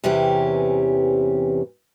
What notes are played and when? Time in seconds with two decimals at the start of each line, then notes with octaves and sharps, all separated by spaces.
0.04 E2 C3 E3 C#4 G4